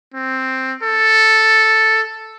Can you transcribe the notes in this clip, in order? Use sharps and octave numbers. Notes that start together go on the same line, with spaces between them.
C4
A4